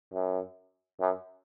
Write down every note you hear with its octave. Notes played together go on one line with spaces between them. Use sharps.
F#2
F#2